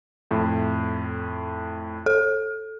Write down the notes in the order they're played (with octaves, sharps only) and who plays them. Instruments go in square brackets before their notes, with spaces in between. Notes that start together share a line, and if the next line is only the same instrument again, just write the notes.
[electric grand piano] F2 A2
[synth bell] A4